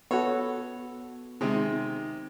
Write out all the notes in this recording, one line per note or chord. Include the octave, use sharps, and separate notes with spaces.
B3 F#4 A4 C#5
C3 D#3 G#3